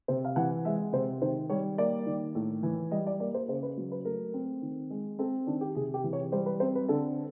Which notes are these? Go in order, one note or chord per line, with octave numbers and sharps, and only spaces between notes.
C3 C5
F5
E3 F#5
G#3 E5
C3 C5
D#3 C5
G3 C#5
A#3 D5
D#3
A2
E3
G3 D#5
D5
A#3 D5
C5
C#3 C5
B4
F#3
B4
A3 A#4
C4
D#3
G#3
C4 A4
D#3 D4
G4
C3 G#4
G4
E3
C#5
G3 C5
B4
C4 C5
B4
D3 A4